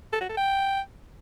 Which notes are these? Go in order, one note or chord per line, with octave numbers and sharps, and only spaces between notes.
A4
F#4
A4
G5